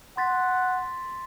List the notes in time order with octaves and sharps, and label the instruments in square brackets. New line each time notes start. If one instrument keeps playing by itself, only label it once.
[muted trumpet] F#5 [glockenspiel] C6 A6 B6